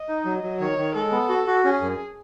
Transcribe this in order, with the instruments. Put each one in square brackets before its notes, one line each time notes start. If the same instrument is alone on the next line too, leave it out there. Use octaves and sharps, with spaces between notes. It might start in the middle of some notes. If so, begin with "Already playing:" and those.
Already playing: [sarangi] D#5
[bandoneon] D#4
F#3
F#3
[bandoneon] D#3 [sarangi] C#5
[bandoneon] D#3
[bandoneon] G#3 [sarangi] A4
[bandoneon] B3
F#4
F#4
[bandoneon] C#4 [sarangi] G#4
[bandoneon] F#2